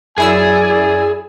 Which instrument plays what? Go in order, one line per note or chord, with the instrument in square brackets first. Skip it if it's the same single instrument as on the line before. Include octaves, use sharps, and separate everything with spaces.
[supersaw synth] F#2 E4 E6 [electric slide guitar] G#4 [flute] D5 [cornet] G#5